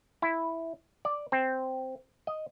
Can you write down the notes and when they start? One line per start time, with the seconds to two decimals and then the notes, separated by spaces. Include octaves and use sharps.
0.22 E4
1.05 D5
1.32 C4
2.27 D#5